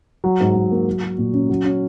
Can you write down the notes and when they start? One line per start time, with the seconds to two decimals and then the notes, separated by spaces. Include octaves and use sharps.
0.24 F#3
0.40 G#2
0.55 G#2
0.71 A#3
0.86 F#3
1.03 F#4
1.18 A#2
1.33 C#4
1.49 F#3
1.65 C#4